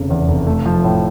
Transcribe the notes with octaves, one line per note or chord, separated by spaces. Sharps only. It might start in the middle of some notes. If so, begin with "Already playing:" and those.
Already playing: F1 C#3
E2
F1
A3
F3
A2